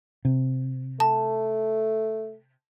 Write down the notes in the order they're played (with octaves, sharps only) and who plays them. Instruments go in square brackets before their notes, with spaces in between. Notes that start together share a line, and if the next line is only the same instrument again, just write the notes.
[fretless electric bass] C3
[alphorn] A3 [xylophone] A5